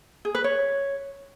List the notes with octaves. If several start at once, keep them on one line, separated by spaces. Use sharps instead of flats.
G#4
B4
C#5